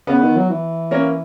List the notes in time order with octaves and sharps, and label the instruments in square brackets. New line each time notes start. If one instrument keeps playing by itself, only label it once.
[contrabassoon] C#3 [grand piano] B3
[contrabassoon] D#3
F#3
E3
[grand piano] A#3 C#4